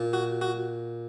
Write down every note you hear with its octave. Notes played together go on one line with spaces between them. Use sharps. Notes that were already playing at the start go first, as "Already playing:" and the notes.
Already playing: A#2
F#4
F#4